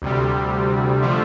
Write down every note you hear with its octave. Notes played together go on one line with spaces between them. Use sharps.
D2 C3 G3
D3 F3 A3